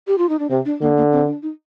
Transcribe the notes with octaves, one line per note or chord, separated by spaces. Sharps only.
G4
F4
D#4
D4
C3 C4
D4
D3 A#3
A#3
C4
D4
D#4